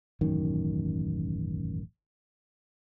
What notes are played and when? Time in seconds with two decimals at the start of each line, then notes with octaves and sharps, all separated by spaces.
0.21 E1 A1 F#2 D#3